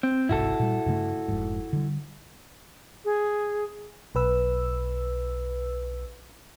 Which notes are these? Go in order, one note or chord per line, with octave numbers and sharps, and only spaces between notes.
C4
G1 C2 G#2 E4 F#4 A4
A#2 G3
G2 C#3 A3
F1 G#2
D3 G3
G#4
B1 B4 E6